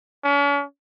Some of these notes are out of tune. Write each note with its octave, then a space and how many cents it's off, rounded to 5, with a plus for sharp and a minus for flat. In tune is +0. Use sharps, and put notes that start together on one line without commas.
C#4 +40